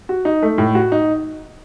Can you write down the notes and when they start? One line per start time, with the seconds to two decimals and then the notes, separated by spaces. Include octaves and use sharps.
0.09 F#4
0.25 D#4
0.42 A3
0.58 A2
0.75 F#4
0.92 D#4